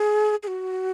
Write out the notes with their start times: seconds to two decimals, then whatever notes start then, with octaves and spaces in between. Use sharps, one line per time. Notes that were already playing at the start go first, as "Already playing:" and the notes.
Already playing: G#4
0.43 G#4
0.47 F#4